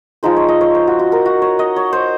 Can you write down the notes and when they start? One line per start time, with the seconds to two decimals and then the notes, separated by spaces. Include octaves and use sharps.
0.23 F3 G#3 D#4 C5
0.37 C#5
0.49 D#5
0.61 C#5
0.75 C5
0.87 F#4
0.99 F#4
1.12 A#4
1.26 F#4
1.42 C#5
1.59 D#5
1.76 C#5
1.93 C5